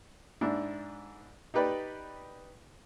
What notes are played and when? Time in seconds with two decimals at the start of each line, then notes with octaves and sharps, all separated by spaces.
0.41 G#2 D4 E4
1.54 D#4 G4 B4 D5